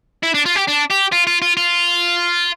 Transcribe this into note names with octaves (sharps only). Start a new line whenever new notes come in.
E4
D4
F4
G4
D4
G4
F4
F4
F4
F4